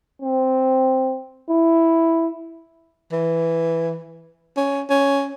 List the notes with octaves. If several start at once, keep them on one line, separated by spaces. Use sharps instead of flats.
C4
E4
E3
C#4
C#4